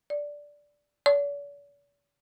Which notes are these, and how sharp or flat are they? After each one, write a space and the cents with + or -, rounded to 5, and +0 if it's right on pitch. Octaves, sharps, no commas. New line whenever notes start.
D5 -5
D5 -45